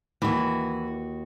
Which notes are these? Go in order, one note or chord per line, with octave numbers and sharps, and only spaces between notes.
D#2 E3 F#4